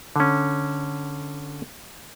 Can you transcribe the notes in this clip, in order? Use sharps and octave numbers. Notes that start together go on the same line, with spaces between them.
D3 C#4